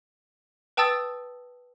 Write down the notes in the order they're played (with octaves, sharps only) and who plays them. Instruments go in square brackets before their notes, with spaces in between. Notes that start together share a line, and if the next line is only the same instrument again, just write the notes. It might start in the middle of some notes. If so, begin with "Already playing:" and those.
[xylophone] B4 G5 A5 D#6 E6 A6